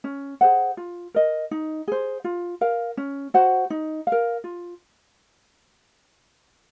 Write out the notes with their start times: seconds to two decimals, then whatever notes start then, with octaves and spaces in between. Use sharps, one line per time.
0.04 C#4
0.41 G#4 C5 F#5
0.77 F4
1.14 A#4 D#5
1.51 D#4
1.88 G#4 C5
2.24 F4
2.61 A#4 F5
2.97 C#4
3.34 F#4 C5 F#5
3.70 D#4
4.07 A#4 F5
4.44 F4